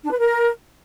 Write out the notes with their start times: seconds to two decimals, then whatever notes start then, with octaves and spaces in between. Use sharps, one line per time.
0.04 D4
0.12 B4
0.20 A#4